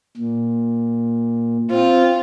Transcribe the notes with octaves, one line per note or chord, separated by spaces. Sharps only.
A#2
C4 F4